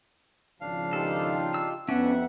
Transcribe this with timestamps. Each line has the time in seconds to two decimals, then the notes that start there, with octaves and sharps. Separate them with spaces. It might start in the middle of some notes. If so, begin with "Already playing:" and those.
0.61 G#1 C#3 F3 D4 F5
0.93 D#4 F4 G4 A4
1.54 E6
1.88 F2 B3 C#4 D4 E5 F#5